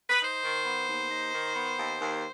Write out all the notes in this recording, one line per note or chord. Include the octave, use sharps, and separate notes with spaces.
B4
D#4 C5
D#3
B3
D#2
D#4
D#3
B3
D#2
D#2